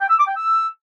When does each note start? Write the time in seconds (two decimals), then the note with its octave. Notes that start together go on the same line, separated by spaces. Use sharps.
0.01 G5
0.10 E6
0.19 D6
0.27 G5
0.36 E6